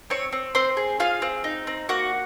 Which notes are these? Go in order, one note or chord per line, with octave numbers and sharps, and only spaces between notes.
C4 C#5 C#6
C4
C4 C5 C6
G#4
F4 G#4 F5
C4
D#4
C4
A#3 F#4 F#5